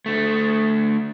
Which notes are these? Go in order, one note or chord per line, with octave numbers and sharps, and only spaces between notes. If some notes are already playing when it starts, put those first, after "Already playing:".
D3 A3